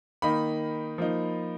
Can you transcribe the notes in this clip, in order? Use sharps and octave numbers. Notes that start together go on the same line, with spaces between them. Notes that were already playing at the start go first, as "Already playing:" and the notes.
D#3 A#3 D#4 B5
F3 A#3 D#4